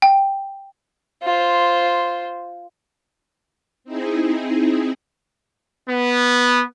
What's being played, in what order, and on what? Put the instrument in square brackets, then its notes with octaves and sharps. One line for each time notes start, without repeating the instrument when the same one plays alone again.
[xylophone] G5
[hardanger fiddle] F4 C5
[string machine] C4 D#4 E4 G#4
[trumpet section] B3